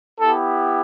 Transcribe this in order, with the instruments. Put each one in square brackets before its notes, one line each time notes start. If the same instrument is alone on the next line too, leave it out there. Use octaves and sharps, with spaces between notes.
[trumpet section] B3 E4 G4 A4